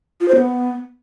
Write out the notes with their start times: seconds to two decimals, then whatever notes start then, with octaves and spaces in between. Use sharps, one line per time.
0.21 F4
0.28 C5
0.36 B3